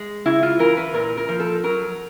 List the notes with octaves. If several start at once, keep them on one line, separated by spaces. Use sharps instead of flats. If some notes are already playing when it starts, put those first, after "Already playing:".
Already playing: G#3
C#3 E4
F4
E3 A#4
B4
A#2 A#4
A#4
F3
A4
F#3 A#4